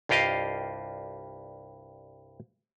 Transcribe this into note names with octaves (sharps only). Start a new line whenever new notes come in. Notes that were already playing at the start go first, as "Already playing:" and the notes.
C2 G2 F4 G4 D#5 F5